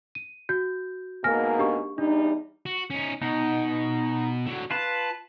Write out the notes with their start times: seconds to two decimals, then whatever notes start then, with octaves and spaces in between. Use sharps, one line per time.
0.15 D#7
0.49 F#4 G6
1.24 G#2 B2 A#3 G#5 F6 A#6
1.58 D4 G4 C#6
1.98 E2 G3 D4 D#4
2.66 F#4
2.90 C#4 D#4
3.22 B2 D#4
4.46 D3 F#3
4.71 F4 B4 A5